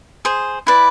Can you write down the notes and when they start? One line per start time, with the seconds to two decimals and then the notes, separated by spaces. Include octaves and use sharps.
0.25 G#4 C5
0.67 E4 B4 D5